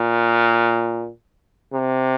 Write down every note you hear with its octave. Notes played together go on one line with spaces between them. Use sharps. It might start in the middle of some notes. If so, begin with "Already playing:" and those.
Already playing: A#2
C3